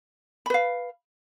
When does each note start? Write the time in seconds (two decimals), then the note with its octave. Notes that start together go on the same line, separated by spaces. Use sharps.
0.46 B5
0.50 B4
0.54 F5